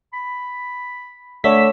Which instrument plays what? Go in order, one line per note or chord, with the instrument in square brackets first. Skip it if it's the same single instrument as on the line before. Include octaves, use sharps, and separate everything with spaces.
[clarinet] B5
[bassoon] D3 [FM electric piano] A3 B6 [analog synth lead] C#5 [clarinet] E6